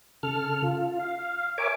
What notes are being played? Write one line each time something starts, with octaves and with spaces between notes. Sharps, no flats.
C#3 A4 F6
F4
F5
A#4 C#5 E5 G#5 D6